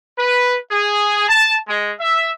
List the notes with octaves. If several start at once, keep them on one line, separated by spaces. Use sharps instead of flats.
B4
G#4
A5
G#3
E5